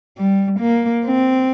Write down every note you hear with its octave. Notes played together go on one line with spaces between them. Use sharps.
G3
A#3
C4